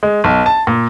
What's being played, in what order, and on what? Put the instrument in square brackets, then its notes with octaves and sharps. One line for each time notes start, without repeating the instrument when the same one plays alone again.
[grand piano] G#3
B1
A5
A#2